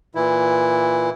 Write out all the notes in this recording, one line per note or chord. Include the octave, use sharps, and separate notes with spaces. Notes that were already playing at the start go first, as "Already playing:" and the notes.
A#2 E3 E4